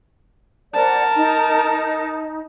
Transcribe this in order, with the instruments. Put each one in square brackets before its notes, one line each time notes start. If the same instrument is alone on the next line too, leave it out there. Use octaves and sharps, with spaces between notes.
[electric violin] A#4 A5 [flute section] C5 D5 F#5
[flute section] D#4